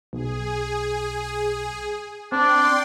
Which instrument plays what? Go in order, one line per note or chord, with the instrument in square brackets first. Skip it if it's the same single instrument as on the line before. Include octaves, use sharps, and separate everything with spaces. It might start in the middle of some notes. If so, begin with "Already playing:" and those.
[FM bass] B1 [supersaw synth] G#4
[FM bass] C4 [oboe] D4 [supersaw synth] D5 G5 C6